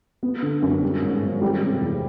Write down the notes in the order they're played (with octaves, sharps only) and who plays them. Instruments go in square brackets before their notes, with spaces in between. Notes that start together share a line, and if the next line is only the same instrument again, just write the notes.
[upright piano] B3
D3
F#2
G3
G#2
G#1
G3
C3
E2